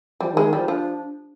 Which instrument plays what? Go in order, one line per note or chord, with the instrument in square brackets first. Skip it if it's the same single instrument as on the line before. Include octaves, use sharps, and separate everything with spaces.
[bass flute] F3 [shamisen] G3
[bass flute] D#3
[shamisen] G#3
[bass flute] D#3
[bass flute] F3 [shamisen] G3
[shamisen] F3 [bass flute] D4